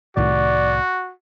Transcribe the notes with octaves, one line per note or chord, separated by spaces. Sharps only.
C2 A2 D#3 F#4 D5